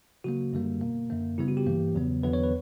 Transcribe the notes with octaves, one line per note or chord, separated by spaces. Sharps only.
C#3 F#3 A#3 F#4
F#2 D3 G3 A#3
B2 A#3
F#2 D3 A#3
C#3 G3 B3 E4
F#4
G4
G2 E3 A#3
E2 C#3 F#3 B3
E2 D3 F#3 B3 B4
C#5
B4